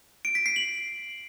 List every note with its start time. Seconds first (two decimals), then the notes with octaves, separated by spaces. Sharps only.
0.25 D7
0.35 B6
0.46 C7
0.56 F#7